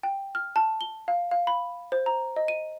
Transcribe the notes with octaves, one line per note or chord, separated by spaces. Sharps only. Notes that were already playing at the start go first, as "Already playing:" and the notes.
G5
F6
A5
G7
F5
F5
B5
C5
A#5
D#5
D#7